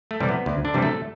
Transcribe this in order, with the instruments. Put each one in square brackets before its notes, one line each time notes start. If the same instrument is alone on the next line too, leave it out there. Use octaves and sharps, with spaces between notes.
[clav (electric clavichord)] A3
C3 E3 G3
B3
D2
D3 D4
C3 E3 G3
A3 A4